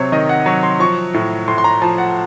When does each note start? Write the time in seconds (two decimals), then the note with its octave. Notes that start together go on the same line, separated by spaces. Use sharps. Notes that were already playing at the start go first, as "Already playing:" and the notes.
Already playing: C3 F#3 C5 C#5
0.12 D#3 D#5
0.29 F#5
0.46 F#3 C#6
0.63 C6
0.80 F3 C#6
1.14 A2
1.48 A2 C6
1.58 C6
1.64 A#5
1.82 F3 A5
1.98 F#5